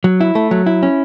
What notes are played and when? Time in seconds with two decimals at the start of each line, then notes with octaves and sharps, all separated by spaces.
0.04 F#3
0.21 E4
0.35 A3
0.51 F#3
0.66 E4
0.83 C#4